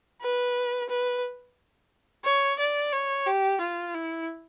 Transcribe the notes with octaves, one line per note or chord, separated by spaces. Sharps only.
B4
B4
C#5
D5
C#5
G4
F4
E4